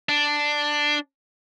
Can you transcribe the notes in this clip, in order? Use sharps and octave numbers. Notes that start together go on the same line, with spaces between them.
D4